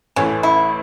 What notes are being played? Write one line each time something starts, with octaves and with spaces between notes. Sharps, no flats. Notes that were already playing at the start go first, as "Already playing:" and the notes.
A1 A2 E3 A3 C#4
E4